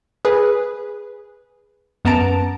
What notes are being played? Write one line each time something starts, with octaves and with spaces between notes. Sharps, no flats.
G#4 B4
F#2 B3 A5 A#5 D7